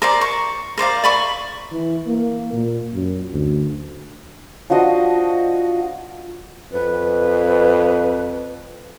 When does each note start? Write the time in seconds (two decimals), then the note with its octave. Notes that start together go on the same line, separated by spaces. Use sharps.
0.02 A#4 C5 D5
0.21 C#6
0.78 A#4 C5 D5 F5
1.04 D5 B5 C#6
1.72 E3
2.07 A#3
2.53 A#2
2.94 F#2
3.32 D2
4.70 F3 D4 F#4 D#5
6.72 F2 B4